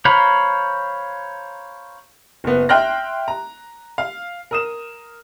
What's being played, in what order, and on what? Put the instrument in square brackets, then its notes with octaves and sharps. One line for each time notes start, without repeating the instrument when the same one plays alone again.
[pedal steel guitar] C5 C#5 F5 A#5 B5
[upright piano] F#1 B3
E5 G5 C6 F6 F#6 A#6
A#5
F5
A#4 D#6 E7